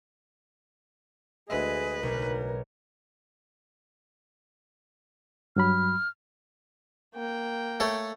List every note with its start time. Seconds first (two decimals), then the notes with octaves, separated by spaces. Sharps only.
1.50 D2 G#3 G#4 B4 D#5 E5
2.03 B1 G#4 A#4
5.56 G2 F#3 B5 F6
7.15 A#3 G5
7.80 A3 A4 C#5